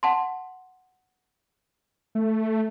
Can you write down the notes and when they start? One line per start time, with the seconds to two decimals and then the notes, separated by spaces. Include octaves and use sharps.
0.03 F#5 A5 C6
2.15 A3